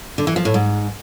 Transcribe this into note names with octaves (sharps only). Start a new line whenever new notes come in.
D3
E3
F3
A2
G#2